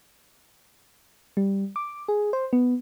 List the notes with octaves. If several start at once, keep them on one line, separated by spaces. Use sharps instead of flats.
G3
D6
G#4
C5
B3